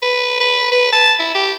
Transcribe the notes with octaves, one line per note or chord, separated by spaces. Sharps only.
B4
B4
B4
A5
E4
G4